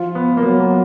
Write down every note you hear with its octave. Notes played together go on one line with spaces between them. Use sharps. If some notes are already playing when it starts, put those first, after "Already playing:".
Already playing: F3 F4
B3
A#3
F#3 B3
A#3